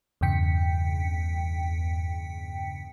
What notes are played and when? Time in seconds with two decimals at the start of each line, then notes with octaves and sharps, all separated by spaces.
0.21 E2 G2 C#3 G5 B6 C#7